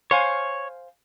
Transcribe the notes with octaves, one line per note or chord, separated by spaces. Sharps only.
C5 C#5 F5 G#5